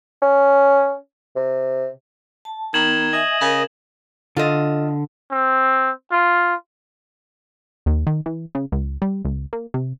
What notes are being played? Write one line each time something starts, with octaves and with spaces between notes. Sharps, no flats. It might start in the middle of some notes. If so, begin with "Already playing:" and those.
C#4
C3
A5
D#3 B3 A#5 G#6 E7 F#7
D#5 E5 G#5
C#3 A#4
D3 F4 A4 D#5
C4
F4
D#2
D#3
E3
C#3
C#2
G3
C#2
A#3
C3